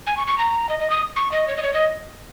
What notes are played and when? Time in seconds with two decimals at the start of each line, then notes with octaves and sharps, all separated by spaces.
0.07 G#5
0.17 C#6
0.27 C#6
0.38 A#5
0.69 D#5
0.79 D#5
0.90 D#6
1.16 C#6
1.32 D#5
1.48 C#5
1.57 D#5
1.63 C#5
1.74 D#5